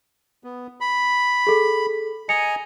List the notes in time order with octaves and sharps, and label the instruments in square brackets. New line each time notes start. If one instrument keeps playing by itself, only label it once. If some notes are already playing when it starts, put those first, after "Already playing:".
[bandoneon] B3
B5
[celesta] G#4 A4
[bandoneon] D#5 G#5 A#5 [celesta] C#7